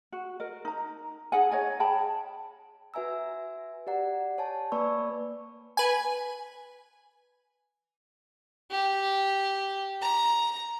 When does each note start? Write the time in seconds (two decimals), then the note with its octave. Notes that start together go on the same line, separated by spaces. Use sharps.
0.13 F#4
0.40 A#4 D#5
0.65 D#4 A#5
1.32 D#4 G#4 F#5 G#5
1.51 C#5 D#5 G#5
1.80 G#4 G5 A5 B5
2.94 F#4 B4 E5 G#5 A#5 E6
3.87 G4 D5 F#5 A#5
4.38 C#5 G#5 A5
4.72 A#3 B4 D5 B5 C#6 E6
5.77 B4 G#5
8.71 G4
10.02 A#5